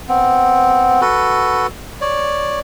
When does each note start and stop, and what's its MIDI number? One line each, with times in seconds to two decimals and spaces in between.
0.09 1.01 59
0.09 1.01 60
1.01 1.67 66
1.01 1.67 69
1.01 1.67 71
2.01 2.59 73
2.01 2.59 74